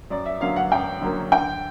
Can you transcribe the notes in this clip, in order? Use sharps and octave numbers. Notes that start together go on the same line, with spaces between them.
F#2 D5
E5
D3 F#3 A#3 C#4 F5
F#5
F#2 G5
D3 F#3 A#3 C#4
D3 G5